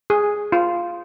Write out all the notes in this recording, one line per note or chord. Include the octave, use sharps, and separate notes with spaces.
G#4
F4